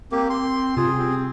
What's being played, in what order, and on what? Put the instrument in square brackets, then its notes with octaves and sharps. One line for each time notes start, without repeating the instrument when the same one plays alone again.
[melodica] A#3 G4 [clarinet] C4
[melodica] C6
[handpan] C3 [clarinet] F4 [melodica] G#4
[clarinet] C4